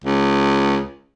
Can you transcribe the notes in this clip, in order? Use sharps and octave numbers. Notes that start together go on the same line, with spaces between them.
C#2